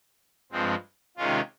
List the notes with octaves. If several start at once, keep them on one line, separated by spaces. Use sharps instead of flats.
G2 F3 G#3 C4
C3 D#3 G#3 C#4 F4